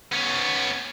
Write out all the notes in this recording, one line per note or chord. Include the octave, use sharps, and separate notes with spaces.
B3 C#4